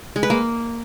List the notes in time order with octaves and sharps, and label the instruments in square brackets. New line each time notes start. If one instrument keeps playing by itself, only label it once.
[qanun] G#3
B4
A#3